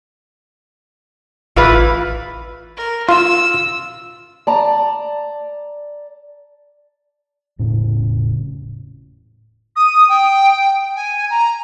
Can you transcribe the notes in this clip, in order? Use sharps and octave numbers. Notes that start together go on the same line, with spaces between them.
A1 E3 F4 B4
A#4
F4 E6
D5 A5 A#5
E1 A2 C#3 C#4
D#6
G5
G#5
A#5